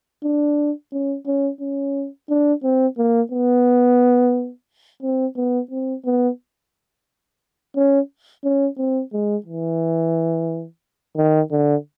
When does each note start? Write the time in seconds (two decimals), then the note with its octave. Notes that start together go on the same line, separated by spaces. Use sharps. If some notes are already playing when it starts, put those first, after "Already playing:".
0.24 D4
0.92 C#4
1.26 C#4
1.61 C#4
2.29 D4
2.63 C4
2.98 A#3
3.32 B3
5.03 C4
5.36 B3
5.71 C4
6.05 B3
7.76 C#4
8.44 C#4
8.78 C4
9.13 G#3
9.46 E3
11.17 D#3
11.52 D3